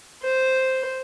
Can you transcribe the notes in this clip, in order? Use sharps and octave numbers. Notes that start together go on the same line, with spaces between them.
C5